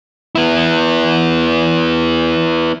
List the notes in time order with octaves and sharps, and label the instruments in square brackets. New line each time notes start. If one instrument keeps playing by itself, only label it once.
[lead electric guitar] B3 E4